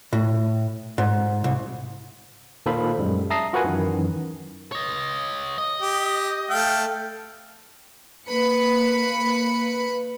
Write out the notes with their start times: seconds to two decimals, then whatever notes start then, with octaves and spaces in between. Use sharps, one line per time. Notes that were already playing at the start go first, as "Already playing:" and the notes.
0.13 A2
0.98 G#2
1.44 C2
2.66 A#2 D#3 A4 C5 F5 B5
2.98 F#2 G3 G#3
3.30 E5 A5 A#5 D#6 A#6 C7
3.53 F4 F#4 A#4 B4 F#5 G#5
3.65 F#2 D#3 E3
4.72 C#5 D#5
5.58 D#5
5.81 G4
6.50 A3 F5 G5
8.28 A#3 B4 B5 C#7